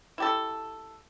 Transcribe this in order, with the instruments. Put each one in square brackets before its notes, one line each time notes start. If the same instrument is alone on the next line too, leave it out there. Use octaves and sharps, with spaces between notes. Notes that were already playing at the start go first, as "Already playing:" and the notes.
[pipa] E4 G4 A4